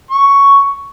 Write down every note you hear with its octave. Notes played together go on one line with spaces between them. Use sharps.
C#6